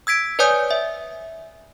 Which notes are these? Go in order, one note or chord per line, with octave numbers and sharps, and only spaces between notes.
E6 G#6 B6 D7
B4 C#5 D5 G#5 D#6 G6
E5